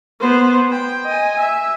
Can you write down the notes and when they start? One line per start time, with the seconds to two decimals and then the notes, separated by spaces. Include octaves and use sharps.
0.20 B3 C5
0.71 G5
1.06 D#5 G#5
1.40 E5